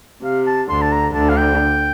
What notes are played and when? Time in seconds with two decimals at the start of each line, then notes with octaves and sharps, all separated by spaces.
0.24 C3 F5
0.47 A5
0.69 D2 D3 C6
0.82 A5
0.92 A#5
1.15 D2 D3 A5
1.29 F5
1.37 G5